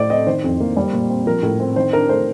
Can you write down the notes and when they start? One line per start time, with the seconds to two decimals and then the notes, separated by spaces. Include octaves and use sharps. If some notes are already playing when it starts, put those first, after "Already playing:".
Already playing: A2 A3 C5 D5
0.10 C4 D#5
0.27 D#3 C5
0.44 F2
0.60 A#3
0.77 G3
0.93 A#2
1.10 C4
1.26 F3 A#4
1.43 A2
1.60 C4
1.76 D#3 C5
1.93 D4 A#4
2.09 A3 C5